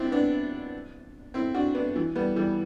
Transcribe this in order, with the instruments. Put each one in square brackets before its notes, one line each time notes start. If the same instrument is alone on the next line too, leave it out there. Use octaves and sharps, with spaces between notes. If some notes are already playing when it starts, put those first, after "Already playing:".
Already playing: [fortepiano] B3 C4 D4 E4
B3 D4
C4 E4
D4 F#4
B3 D4
E3
G3 B3
E3 G3